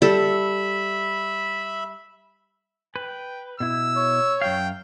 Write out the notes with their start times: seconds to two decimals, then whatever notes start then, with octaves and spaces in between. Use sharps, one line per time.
0.02 G3 A4 E5 B5
2.96 B4 G5
3.60 B2 E4 E6
3.96 C#5
4.42 F#2 F#3 F5 G5